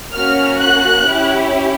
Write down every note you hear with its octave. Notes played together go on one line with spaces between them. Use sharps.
A#3 C#4 F#4 F6
F#6
C#4 E4 G4